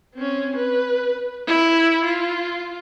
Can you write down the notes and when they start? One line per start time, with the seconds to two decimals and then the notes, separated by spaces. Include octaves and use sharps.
0.14 C4 C#4
0.56 B4
1.47 E4
2.05 F4